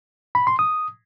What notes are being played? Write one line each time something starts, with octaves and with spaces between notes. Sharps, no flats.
B5
C6
D#6